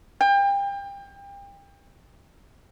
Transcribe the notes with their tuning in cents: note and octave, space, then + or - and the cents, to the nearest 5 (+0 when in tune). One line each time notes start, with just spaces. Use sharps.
G5 +30